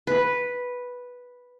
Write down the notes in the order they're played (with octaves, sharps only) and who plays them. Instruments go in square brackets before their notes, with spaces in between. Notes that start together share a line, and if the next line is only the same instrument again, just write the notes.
[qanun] B4